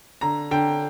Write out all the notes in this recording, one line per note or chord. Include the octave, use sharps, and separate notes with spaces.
D3 A#5
D3 G5